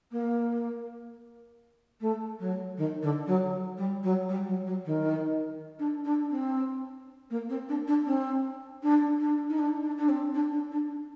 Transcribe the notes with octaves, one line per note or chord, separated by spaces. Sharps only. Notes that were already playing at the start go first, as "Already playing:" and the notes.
A#3
A3
F#3
D#3
D3
F#3
G3
F#3
G3
F#3
F#3
D#3
D4
D4
C4
A#3
C4
D4
D4
C4
D4
D4
D#4
D4
D4
D4
C4
D4
D4
D4